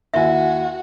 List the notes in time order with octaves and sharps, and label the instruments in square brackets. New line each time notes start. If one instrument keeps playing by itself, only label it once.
[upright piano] D#2 E4 G#5 [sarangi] F#4 [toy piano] E5